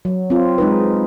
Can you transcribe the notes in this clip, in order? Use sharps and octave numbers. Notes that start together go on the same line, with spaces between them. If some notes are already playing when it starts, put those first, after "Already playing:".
F#3
C4 F4
G#3 D#4 B4